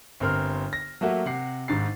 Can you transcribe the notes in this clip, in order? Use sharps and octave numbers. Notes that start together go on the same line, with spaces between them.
G1 C4 A#4 C6 F6
A#6
F#3 A3 A#3 F#4 E5
C3 F#5 C7
G#1 G#2 A6 C7